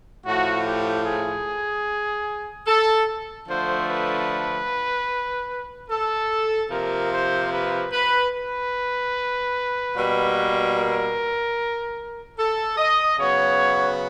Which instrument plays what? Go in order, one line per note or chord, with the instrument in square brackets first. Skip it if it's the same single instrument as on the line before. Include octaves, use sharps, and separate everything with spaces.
[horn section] A2 F3 A3 F#4
G4
G#4
A4
D3 F3 A3 C5
B4
A4
C3 F3 A#3 A#4
C5
B4
B4
B4
B2 G3 A#3
A#4
A4
D#5
C#3 F#3 B3 C#5